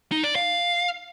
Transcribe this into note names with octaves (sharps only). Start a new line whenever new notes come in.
D#4
D5
F5